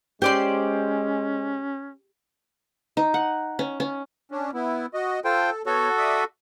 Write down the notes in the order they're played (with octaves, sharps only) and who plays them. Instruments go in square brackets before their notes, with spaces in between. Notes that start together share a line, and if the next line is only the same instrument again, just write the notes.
[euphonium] G#3 [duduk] C#4 [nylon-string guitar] G4 [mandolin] C5 D5 C6
[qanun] D#4
F#5
C#4
C#4
[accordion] C#4 D4
B3 E4
F#4 D#5
[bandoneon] F4 C5 G5 [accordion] A4
[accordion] B3 C#5 [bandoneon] F#4 A4
[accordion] D5 E5 D#6